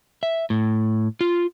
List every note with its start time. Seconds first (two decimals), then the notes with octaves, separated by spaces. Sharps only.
0.23 E5
0.50 A2
1.21 F4